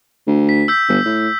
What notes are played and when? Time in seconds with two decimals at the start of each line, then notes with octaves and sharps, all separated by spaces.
0.27 D2
0.49 B6
0.68 E6 G6 B6
0.89 G1
1.06 A2